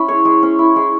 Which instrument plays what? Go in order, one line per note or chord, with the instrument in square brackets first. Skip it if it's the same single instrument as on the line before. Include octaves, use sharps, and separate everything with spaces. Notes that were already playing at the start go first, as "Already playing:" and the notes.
Already playing: [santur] C#4 E4
G#3 C#5
G#3
C#4
E4
G#3